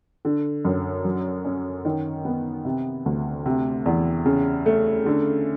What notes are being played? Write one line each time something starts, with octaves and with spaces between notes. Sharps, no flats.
D3
F#2
F#3
C#4
D#3
B3
C3
D2
C3
E2
C#3
A3
D3